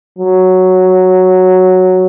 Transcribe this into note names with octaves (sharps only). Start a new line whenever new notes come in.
F#3